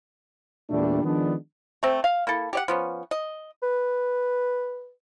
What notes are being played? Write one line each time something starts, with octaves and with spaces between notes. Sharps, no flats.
E2 A#2 G3 A3 D4
D#3 F3 G#3 B3 D4
A3 C4
F5
A#3 E4 A4
G4 D5 F#5
F3 B3 C#4
D#5
B4